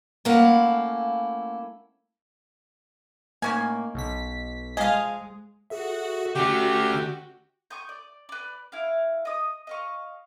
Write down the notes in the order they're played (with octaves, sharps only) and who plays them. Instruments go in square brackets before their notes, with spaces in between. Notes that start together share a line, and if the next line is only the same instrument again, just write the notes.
[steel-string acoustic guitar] A3 A#3 C#4 E4 F5 F#5
[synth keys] A2 A#3 [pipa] D#3 C#4 G#5
[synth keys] B1 B2 B6
[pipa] F3 G#4 [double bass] G#3 [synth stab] D#5 F5
[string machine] F#4 [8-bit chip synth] G#4 A4 E5
[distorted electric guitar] D3 A3 [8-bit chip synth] C#4 [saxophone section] G4
[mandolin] C#6 D#6 G6
D5
B4 D5
E4 F5
D#5 D#6
D#5 F5 C#6